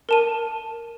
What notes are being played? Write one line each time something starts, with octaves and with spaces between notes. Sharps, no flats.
A#4 A5 D#7